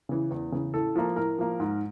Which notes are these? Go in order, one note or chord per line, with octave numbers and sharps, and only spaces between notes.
C#3 E3
E2
C#3 E3
A2 A4
F3 A#3
A2 A#4
F3 A#3
G#2